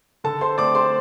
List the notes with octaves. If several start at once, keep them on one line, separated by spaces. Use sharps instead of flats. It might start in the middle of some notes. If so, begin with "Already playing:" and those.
D3 A4 A5
C5 C6
A3 C4 D5 D6
C5 C6